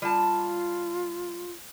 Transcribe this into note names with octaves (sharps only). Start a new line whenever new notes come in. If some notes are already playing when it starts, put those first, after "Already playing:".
G3 F4 A5